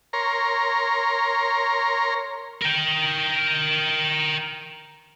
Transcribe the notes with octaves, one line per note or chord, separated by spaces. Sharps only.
A#4 C#5 A#5 C6
A#4 G5